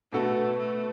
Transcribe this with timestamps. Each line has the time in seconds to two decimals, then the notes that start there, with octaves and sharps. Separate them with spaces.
0.12 B2 A3 B3 F#4 A4
0.58 A3